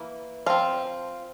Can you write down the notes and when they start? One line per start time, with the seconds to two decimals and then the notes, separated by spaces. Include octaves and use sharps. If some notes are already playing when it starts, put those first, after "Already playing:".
Already playing: E3 A#3
0.46 F3 C4 F5